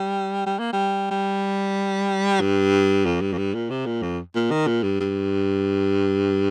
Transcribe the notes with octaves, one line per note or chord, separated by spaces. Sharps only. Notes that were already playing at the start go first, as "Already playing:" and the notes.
Already playing: G3
G3
A#3
G3
G3
G2
F2
G2
F2
G2
A#2
C3
A#2
F2
A#2
D#3
A#2
G2
G2